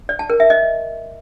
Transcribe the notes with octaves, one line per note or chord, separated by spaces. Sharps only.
D5
A5
A#4
E5
D#5